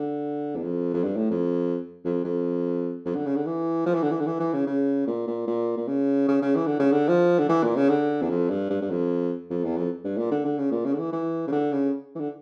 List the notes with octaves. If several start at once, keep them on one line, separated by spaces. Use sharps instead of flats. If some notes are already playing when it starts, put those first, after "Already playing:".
Already playing: D3
E2
F2
F2
G2
A2
F2
F2
F2
F2
D3
C#3
D3
E3
F3
E3
D3
E3
D3
E3
E3
C#3
C#3
A#2
A#2
A#2
A#2
C#3
C#3
C#3
E3
D3
C#3
D3
F3
D3
E3
A#2
C#3
D3
E2
F2
G2
G2
G2
F2
F2
E2
F2
G2
A#2
D3
D3
C#3
A#2
C#3
D3
E3
E3
C#3
D3
C#3
E3
D3